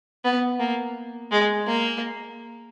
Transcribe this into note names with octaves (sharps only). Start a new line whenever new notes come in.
B3
A#3
G#3
A#3